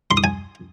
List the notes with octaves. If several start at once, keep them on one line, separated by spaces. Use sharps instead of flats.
C6
D#6
G#5